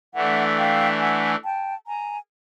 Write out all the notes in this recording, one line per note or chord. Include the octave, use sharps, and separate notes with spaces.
E3 A3 D4 E5 F#5
F5 G5
F#5 G#5
G5 A5
G#5 A#5